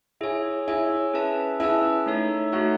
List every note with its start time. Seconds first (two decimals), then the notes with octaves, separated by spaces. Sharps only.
0.21 E4 G#4 C#5 G#5
0.68 E4 G#4 C#5 G#5
1.14 C#4 G#4 B4 E5 A5
1.60 C#4 E4 G#4 B4 E5 A5
2.06 A3 D#4 A4 C#5 E5
2.52 A3 D#4 F#4 A4 C#5 E5